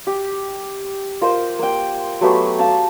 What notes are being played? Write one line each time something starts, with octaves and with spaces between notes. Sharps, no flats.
G4
F4 A#4 C5 D#5
A#3 G5
F#3 A3 B3 G4
F5 A5 A#5